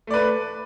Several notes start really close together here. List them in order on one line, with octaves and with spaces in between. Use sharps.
A3 D5 B4